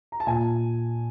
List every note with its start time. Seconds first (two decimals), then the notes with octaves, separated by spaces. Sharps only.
0.12 A#5
0.20 A5
0.27 A#2 G#5